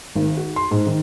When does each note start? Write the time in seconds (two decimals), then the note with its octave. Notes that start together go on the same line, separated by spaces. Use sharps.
0.15 G#1
0.37 F#4
0.56 C6
0.71 G#2
0.87 D#3